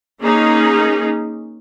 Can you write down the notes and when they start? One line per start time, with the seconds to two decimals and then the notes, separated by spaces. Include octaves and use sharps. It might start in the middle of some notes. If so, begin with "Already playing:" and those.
0.21 A#3 C#4 D#4 G#4